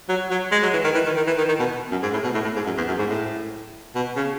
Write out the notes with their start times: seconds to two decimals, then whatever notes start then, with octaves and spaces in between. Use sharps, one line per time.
0.09 F#3
0.31 F#3
0.52 G#3
0.63 F#3
0.73 E3
0.84 D#3
0.95 E3
1.06 D#3
1.16 D#3
1.27 E3
1.38 D#3
1.48 D#3
1.59 B2
1.91 F#2
2.03 G#2
2.13 A2
2.24 B2
2.34 A2
2.45 A2
2.56 G#2
2.66 F#2
2.77 E2
2.88 F#2
2.99 G#2
3.09 A2
3.95 B2
4.16 C#3